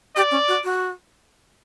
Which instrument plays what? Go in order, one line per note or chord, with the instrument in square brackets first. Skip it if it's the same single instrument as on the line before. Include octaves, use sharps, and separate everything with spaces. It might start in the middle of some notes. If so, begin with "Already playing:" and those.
[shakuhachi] G4 [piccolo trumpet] D5
[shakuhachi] C#4
F#4
F#4